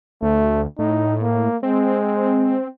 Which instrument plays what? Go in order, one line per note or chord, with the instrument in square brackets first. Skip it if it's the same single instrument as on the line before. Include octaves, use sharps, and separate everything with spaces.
[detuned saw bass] D2 [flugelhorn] A3
[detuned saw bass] A2 [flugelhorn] D#4
[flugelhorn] A#3
[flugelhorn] G#3 [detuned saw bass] C4